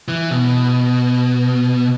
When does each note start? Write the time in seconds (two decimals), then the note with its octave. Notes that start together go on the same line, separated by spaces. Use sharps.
0.08 E3
0.31 B2